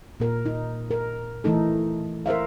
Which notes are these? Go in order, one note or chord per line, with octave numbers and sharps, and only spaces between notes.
A#2 A#4
D#4
A#4
E3 A3 D#4 A4
A#4 C5 E5 F5